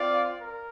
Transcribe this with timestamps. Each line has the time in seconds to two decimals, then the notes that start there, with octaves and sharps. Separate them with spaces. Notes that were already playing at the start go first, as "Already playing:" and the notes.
Already playing: C4 F4 D5 F5
0.41 A#4